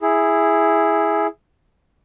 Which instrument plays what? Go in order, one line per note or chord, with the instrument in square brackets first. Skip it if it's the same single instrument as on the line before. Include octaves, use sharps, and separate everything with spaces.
[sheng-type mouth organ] E4 G#4